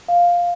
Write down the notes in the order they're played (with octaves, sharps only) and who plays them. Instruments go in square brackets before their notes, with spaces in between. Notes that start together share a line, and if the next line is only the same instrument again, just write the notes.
[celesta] F5